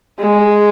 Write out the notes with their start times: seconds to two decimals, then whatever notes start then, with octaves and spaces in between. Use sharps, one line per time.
0.20 G#3